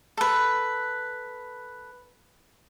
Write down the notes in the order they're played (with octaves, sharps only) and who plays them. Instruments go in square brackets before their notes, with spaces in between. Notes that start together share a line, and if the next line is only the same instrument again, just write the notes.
[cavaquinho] A4 B4